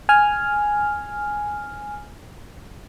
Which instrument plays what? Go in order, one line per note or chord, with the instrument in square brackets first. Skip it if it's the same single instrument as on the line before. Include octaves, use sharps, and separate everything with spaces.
[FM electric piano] G#5 F6